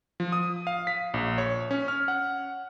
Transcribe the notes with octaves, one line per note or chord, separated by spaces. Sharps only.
F3
D#6
F5
B6
A#1
C#5
C#4
F6
F#5